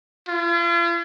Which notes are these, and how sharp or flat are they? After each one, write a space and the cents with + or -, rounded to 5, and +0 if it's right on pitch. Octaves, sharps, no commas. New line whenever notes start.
F4 -45